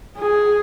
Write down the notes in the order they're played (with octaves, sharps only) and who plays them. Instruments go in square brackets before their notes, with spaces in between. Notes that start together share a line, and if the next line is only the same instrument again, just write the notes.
[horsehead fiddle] G#4